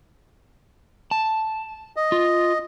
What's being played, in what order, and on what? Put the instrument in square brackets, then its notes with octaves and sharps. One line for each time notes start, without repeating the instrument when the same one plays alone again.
[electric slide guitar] A5
[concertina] D#5
[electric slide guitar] F4